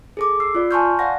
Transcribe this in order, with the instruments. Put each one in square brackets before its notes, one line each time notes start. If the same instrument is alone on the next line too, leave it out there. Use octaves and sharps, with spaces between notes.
[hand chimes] G#4 A4 D6
E6 C7
F4 D5
G#5 A5 C6 C#6 F6 G6
D5 F5 F#5 A#6